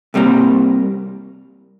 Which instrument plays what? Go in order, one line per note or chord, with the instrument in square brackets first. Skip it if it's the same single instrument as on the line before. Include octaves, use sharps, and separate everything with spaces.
[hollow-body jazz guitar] C2 C3 G3 A#3